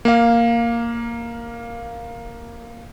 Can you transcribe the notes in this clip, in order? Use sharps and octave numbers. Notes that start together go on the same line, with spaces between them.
A#3 F5